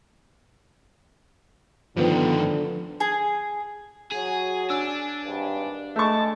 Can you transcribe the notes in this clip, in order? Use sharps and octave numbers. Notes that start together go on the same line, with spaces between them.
G2 D3 D#3 F3 B3
G#4
F#3 F#4 G#4 G#5
D4 E6
G#1 G2
G#3 A3 A5 C#6